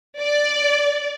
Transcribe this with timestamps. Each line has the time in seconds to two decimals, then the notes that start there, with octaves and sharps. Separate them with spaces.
0.21 D5